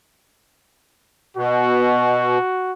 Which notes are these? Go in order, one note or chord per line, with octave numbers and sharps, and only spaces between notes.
B2 F#4